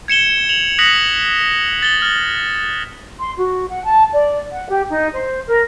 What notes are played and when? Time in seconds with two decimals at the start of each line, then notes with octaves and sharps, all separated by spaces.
0.08 G#6 C#7 E7 G7
0.49 F7 F#7
0.79 D#6 F#6 A#6 B6 C#7 F#7
1.83 A6 G7
2.02 F6 A6
3.19 C6
3.38 F#4
3.68 F#5
3.84 A5
4.12 D5
4.51 F#5
4.69 G4
4.89 D#4
5.13 C5
5.46 A#4